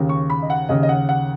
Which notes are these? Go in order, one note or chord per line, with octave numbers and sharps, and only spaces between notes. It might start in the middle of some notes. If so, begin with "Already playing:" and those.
Already playing: D#2 C#3
C#6
B5
D#5
F#5
D#2 C#3 D#5
D#5
F#5
F#5